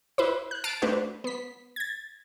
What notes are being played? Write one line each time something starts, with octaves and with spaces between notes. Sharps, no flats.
E4 B4 C5
F#6
A5 F6 A6 C7 D7
A3 D4 F#4 B4 C5
B3 B6
G#6 A6